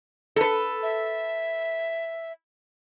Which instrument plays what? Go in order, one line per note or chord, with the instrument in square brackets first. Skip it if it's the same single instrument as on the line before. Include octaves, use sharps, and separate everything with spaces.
[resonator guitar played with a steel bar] A4 B4
[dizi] E5